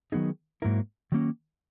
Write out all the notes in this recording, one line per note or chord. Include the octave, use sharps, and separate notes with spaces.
D#3 F#3 B3 D#4 G#4
G#2 F#3 A#3 E4 A#4
D#3 F#3 A#3 C#4